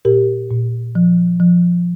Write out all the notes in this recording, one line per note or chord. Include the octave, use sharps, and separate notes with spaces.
A#2 G4 A#4
A#2
F3
F3